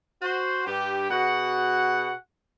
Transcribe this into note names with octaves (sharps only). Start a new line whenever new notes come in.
F#4 C5
G2 G4
B2 F#4 G#4 F#5